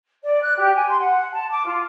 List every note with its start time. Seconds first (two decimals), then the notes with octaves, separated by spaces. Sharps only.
0.23 D5
0.42 F#6
0.57 G4
0.75 G#5
0.88 C6
0.99 F#5
1.33 A5
1.50 D6
1.66 F4